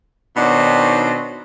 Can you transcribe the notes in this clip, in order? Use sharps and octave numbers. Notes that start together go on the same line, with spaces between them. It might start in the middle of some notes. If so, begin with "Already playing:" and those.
B2 D#3 C4 D4 D#4 C#5